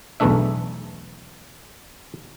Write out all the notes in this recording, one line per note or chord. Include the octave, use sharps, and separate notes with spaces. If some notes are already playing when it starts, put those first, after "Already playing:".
B1 E2 E3 A3 D4 E5